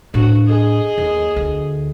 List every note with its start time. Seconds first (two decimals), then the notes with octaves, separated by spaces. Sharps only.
0.14 A2 D4 F#4
0.48 G#4 D#5
0.98 D#2
1.36 D2